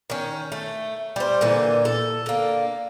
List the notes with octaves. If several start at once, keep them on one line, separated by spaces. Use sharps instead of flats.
D#3 C#4
A3
G3 C5
A#2 D3 E3
A4
D3 A#3